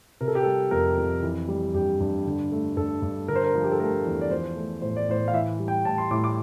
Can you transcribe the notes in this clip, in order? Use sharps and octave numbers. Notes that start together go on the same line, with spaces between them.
C3 A#4
A4
G4
G3 A4
F2 A#4
F2
E3
G3
G2 G4
G2
D3
A3
G2 A4
G2
D3 A#4
C5
A#4
F3
G4
A4
A3 A#4
E2
D5
F3 C5
A3
A2 C5
D5
A2 C5
F5
E3 E5
G3
G5
A2 A5
C6
A2 D6
D6